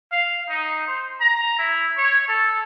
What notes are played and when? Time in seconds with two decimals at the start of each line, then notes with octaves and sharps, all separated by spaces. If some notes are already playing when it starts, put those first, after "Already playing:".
0.12 F5
0.49 D#4
0.87 C5
1.21 A#5
1.59 E4
1.98 C#5
2.28 A4